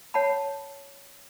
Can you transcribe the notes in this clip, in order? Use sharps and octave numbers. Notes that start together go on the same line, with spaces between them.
C#5 F#5 A5 B5